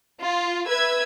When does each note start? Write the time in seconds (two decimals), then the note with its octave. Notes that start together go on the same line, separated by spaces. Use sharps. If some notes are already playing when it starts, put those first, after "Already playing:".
0.19 F4
0.68 B4 E5 E6 G#6